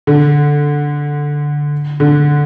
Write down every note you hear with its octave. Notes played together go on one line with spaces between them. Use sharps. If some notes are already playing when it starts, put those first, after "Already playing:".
D3
D3